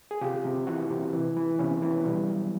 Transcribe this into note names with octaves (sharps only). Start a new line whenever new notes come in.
G#4
C3 F4 G4
C3
E3 E4 F#4
C3
E3
E3
C3 B3 C#4
E3
B2 G3
F#3